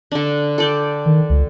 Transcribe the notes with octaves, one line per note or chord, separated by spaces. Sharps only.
D3 D4
A4 D5 G5
D#3
C#2